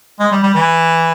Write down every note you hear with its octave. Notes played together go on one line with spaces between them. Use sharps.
G#3
G3
G3
E3